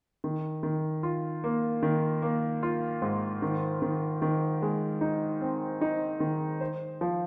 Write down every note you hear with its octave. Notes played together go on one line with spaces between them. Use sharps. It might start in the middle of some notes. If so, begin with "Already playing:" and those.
D#3
D#3
F4
A#3
D#3
A#3
F4
G#2
D#3
D#3
D#3
G#3
D#4
C4
D#4
D#3
C5
F3